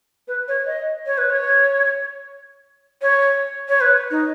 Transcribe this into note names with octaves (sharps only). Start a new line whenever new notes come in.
B4
C#5
D#5
C#5
B4
C#5
C#5
C#5
B4
D#4